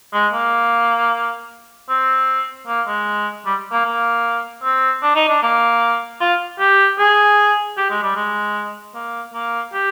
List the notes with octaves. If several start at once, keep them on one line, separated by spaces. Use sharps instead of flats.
G#3
A#3
C4
A#3
G#3
G3
A#3
A#3
C4
D4
D#4
D4
A#3
F4
G4
G#4
G4
G#3
G3
G#3
A#3
A#3
G4